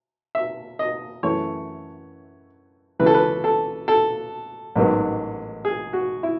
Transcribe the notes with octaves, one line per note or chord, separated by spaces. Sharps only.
E5
D#5
F#2 E3 A3 C#5
C#2 C#3 E3 B4
A4
B4
A4
A4
A1 G#2 D#3 F#3 B3
G#4
F#4
E4